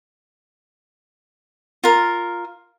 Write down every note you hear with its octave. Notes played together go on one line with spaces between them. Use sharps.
F4 A#4